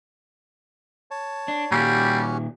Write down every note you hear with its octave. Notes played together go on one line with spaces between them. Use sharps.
C#5 A5
D4
A#2 D#3 G3 C#4 F#4 G4